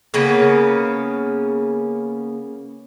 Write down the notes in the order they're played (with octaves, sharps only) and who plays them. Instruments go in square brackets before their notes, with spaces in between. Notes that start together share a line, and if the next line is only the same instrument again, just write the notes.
[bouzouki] C#3 A#3 B3 C#4